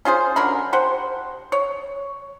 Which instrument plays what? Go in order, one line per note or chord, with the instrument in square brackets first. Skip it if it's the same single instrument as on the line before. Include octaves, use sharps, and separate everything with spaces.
[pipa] C#4 F4 G#4 C5
D3 F#3 A#4 B5
G4 C5 F#5
C#5